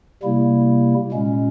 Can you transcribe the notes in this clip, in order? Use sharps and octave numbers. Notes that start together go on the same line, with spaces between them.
C3 G3 A#3 E4
A#2 G#3 C#4